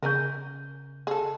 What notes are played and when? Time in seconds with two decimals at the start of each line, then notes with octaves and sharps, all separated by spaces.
0.03 C#3 C#4 G#4 A#4 G6
1.07 G#4 A4